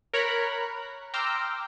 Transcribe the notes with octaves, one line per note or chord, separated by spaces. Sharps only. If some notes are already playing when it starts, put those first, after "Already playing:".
A#4 C#5 A#5 B5 F#6
G5 A#5 C6 D6 E6 F6